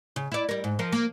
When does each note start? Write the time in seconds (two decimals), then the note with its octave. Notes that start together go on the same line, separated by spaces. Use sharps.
0.16 C#3
0.32 E4 D5
0.49 G3 A#4
0.64 G#2
0.79 F3 A#4
0.92 A#3